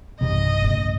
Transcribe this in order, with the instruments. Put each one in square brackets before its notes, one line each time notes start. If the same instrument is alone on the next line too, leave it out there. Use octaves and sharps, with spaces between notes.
[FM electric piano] B1 E2 G2 [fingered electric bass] C3 [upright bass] D#3 [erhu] D#5
[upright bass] A2 C#3